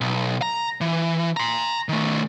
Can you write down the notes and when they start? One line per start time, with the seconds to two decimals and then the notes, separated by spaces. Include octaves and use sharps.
0.01 B1
0.42 A#5
0.81 E3
1.37 A#5 C6
1.89 D#3 A3